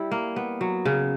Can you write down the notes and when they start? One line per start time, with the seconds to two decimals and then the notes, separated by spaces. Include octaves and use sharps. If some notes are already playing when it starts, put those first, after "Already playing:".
Already playing: G3 E4
0.11 A#3
0.36 B3
0.61 F#3
0.85 C#3